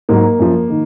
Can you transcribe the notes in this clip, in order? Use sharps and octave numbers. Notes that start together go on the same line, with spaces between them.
G#2 F#3 A#3
F#2 F3
D#3